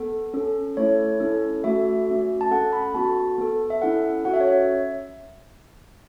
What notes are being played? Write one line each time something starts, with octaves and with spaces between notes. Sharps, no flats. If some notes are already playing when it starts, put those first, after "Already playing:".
Already playing: B3 A4
C#4 A4
A3 E4 A4 C#5
C#4 E4 A4
A3 F#4 A4 E5
A3 C#4 F#4
A5
C#4 A4 F#5
B5
B3 F#4 A4 A5
B3 A4
E5
C#4 E4 A4 F#5
C#4 F#4 A4 F#5
E5
C#5
E5